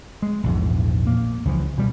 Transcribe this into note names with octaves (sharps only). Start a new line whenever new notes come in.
G#3
A#1 E2 G#2
A#3
C#2 E3 F3
B2 G3